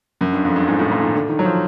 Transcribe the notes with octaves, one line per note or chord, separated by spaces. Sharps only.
F#2
G2
F2
G2
G#2
A2
A#2
D#3
D3
D#3
F#3
F3